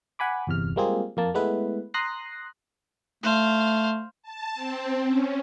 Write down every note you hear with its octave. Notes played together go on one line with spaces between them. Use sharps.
F#5 G#5 B5 D6
G1 E2 C3 F6
G3 G#3 A#3 C4 F4 G#4
F2 A#3 A5
G#3 A3 B3 E4 B4
A#5 C6 D#6 F#6 A#6 C7
A3 C5 F5
A5
C4
C#4